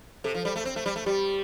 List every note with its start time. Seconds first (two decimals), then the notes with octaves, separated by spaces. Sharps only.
0.24 C3 A4
0.35 F3
0.45 G3
0.56 A3
0.65 C4
0.76 A3
0.86 G3
0.96 A3
1.06 G3 G4